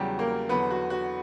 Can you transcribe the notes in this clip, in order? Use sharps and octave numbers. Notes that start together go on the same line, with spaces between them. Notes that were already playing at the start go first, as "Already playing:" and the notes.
Already playing: E2 C#3 F#3 G3 G4
A#3 A#4
E2 D3 F#3 B3 B4
F#4
F#4